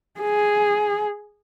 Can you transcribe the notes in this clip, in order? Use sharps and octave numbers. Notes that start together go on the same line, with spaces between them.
G#4